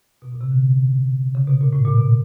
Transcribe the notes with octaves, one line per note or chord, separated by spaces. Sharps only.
B2
A#2
C3
D3
C#3
B2
A#2
A2
A#2
B2